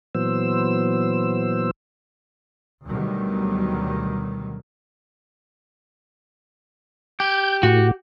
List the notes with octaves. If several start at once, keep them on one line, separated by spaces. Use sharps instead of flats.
A#2 E3 F#3 B3 C5 E6
D2 B2 D#3 F#3 G3
G4 G6
A2 F#4